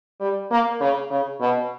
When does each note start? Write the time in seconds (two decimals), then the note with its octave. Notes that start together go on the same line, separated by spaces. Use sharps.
0.20 G3
0.51 A#3
0.80 C#3
1.10 C#3
1.41 B2